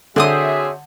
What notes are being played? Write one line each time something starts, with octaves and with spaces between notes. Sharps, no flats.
D3 C4 F#4 G#4 C5 C#5 E5 D#6